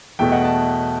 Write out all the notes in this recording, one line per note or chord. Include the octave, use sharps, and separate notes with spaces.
E2 B2 A3 E5 G5
D#5 F#5
F#5 A5